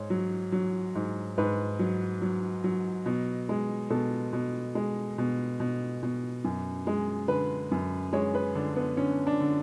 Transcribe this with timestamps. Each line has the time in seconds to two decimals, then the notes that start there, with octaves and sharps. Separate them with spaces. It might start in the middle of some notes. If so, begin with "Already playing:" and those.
Already playing: G#2 C#5
0.10 F#3
0.52 F#3
0.95 G#2
1.38 G#2 B4
1.79 F#3
2.22 F#3
2.64 F#3
3.06 B2
3.49 G#3
3.90 B2 A4
4.33 B2
4.75 G#3
5.18 B2
5.60 B2
6.03 B2
6.44 F#2
6.87 G#3
7.28 D3 B4
7.71 F#2
8.13 G#3 C#5
8.35 B4
8.55 D3 D4
8.76 B3
8.97 D3 C#4
9.27 D4
9.41 D3